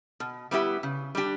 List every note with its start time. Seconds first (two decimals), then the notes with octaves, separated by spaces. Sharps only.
0.20 B2
0.51 G3 B3 E4 G4
0.83 C#3
1.15 G3 D4 G4